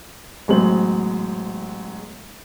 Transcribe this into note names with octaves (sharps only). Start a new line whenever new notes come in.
A1 F#3 G#3 B3 C5 F#7